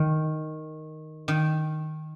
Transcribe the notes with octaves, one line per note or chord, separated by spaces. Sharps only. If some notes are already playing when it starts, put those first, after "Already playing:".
Already playing: D#3
D#3